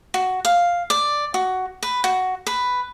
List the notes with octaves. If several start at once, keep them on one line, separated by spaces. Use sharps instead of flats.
F#4
F5
D5
F#4
B4
F#4
B4